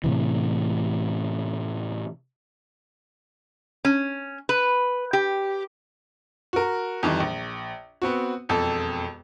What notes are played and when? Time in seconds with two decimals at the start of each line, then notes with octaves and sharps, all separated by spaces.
0.04 A2 C3 E3
3.85 C#4
4.49 B4
5.13 G4
6.53 F#4 A#4
7.03 F2 D#3 E3 G3
7.20 A#1
8.02 B3 C4 F#4
8.49 E1 F2 A4